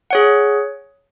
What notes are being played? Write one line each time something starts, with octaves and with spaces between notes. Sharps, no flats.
G#4 C#5 F#5